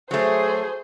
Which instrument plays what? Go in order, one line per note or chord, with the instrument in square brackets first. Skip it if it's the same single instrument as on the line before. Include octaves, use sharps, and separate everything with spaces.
[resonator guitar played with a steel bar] F#3 A3 [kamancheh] G#4 C5